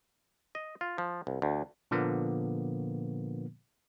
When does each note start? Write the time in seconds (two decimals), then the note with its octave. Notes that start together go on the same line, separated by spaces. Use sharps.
0.55 D#5
0.81 F4
0.98 F3
1.27 C2
1.42 D2
1.91 A#2 D3 F3 A#3 B3